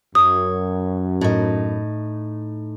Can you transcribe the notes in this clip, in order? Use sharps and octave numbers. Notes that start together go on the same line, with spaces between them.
F#2 C#5 D#6
A2 D#4